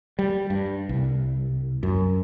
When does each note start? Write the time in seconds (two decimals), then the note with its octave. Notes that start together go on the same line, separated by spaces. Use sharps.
0.19 G3
0.50 G2
0.89 C2
1.83 F#2